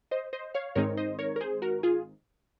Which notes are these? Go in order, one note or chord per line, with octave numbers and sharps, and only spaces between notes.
C5 D#5
C5 D#5
C#5 F5
G#2 D#3 G#3 C4 D#4 A#4 C#5
C5 D#5
A#4 C#5
A#4
G#4 C5
F#4 A#4
F4 G#4